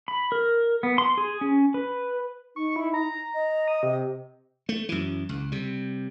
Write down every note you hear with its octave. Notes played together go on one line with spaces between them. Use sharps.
B5
A#4
B3
C6
G#4
C#4
B4
D#4 C#6
E4
A#5
D#5
D#6
C3
A3
F#2 E3
C#2
C3 G3